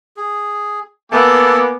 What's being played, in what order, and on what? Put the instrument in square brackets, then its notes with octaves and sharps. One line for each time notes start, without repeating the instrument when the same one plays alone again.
[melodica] G#4
[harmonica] A#3 G#5 D6 [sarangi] B3 [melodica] A4 A5